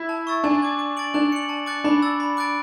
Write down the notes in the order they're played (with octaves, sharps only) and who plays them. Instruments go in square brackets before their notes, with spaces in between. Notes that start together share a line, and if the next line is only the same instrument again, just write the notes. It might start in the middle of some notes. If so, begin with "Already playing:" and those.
Already playing: [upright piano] E4
[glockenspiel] A5
C#6 E6 A6
[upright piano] D4 [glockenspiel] G#5
[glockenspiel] D6 G#6
D6
A6 D7 F#7
[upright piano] D4 [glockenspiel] F#6
[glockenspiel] C#7 F#7
A5
D6 F#6 A6 C#7
[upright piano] D4 [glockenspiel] B5
[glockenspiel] E6 A6
B5
D6 F#6 A6 D7